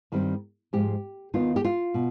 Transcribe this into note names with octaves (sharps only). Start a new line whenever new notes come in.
G2 D#3 G3 C4
G#2 F3 G#3 G4
D#2 D#3 B3 D#4 F4
G4
F4
B2